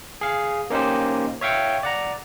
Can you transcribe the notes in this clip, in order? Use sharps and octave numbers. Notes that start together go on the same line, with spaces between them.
G#4 F5
A#3 C#4 D#4 G4 C5
C#5 E5 F5 G5 C#6
D5 F#5 A#5